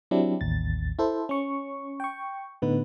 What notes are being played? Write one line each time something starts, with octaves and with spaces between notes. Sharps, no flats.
F#3 C4 D4 E4 G4
A1 D#2 A6
E4 A4 C5
C#4 C#6
G5 C#6
A2 D3 B3 D#4 B4